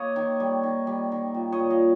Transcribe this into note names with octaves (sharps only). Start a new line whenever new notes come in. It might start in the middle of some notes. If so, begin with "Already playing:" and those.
Already playing: A#3 C#5 D#5
D#3
G3
D#3
G3
D#3
A#2
C#5 D#5
A#2
D#5 F5